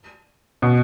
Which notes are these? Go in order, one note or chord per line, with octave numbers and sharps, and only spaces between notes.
B2